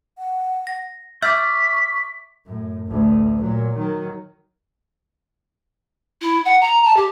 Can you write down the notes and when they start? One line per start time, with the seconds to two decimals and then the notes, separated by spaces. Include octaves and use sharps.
0.18 F#5
0.67 A#6
1.22 E5 C#6 D6 E6 F6 G6 B6
2.46 F#2 A2
2.86 A1 D2
3.41 A#2 F#3
3.76 D#3 F#3
6.21 E4
6.45 F#5
6.61 A#5
6.85 A5
6.96 G4